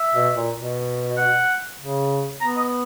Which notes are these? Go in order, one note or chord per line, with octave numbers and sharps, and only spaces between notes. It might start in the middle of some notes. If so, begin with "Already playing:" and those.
Already playing: E5
B2
A#2
B2
F#5
C#3
B3 A#5
D#5